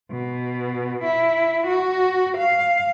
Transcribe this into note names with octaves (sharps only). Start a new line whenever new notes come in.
B2
E4
F#4
F5